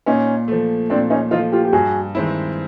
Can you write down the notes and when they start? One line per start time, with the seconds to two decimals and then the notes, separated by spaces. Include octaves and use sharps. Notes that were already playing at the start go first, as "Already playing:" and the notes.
0.06 A#2 C#4 D#4
0.48 F3 A3
0.90 A#2 C4 D4
1.10 C#4 D#4
1.31 F3 A3 D#4 F4
1.52 F4 G4
1.64 G4
1.73 G2 F#4 G#4
2.15 D#3 G#3 C4 E4